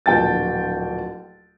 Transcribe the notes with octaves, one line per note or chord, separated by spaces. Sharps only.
D1 A#1 G5 A5 A6